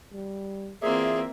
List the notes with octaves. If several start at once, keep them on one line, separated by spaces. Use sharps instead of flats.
G3
E3 A#3 C4 F4 G#4 D5 E5